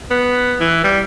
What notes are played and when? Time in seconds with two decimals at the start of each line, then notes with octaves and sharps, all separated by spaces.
0.11 B3
0.60 E3
0.84 G3